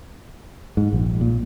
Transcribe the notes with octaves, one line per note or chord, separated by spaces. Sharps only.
G#2
A#1
A#2